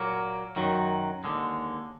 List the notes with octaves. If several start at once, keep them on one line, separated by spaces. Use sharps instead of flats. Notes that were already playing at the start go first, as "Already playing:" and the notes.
Already playing: A#2 F#3 A#3
F#2 D#3 F#3
D#2 D3 G#3